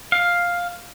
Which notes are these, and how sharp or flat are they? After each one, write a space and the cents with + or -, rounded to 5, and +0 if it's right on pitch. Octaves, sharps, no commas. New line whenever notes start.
F5 +5